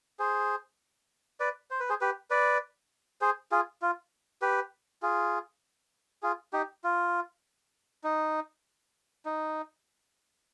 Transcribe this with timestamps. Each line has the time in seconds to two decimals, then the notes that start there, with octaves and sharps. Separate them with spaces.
0.19 G#4 C5
1.40 B4 D5
1.71 C5
1.80 B4
1.89 G#4 C5
2.01 G4 B4
2.30 B4 D5
3.21 G#4 C5
3.52 F4 G#4
3.82 F4
4.42 G4 B4
5.02 F4 G#4
6.23 F4 G#4
6.53 D#4 G4
6.84 F4
8.04 D#4
9.25 D#4